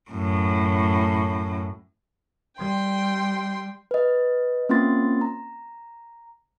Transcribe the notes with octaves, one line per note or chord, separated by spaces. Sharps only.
F#2 A2
G3 G5 C6
B4 D#5
A#3 C4 C#4 F4 C6 A6
A#5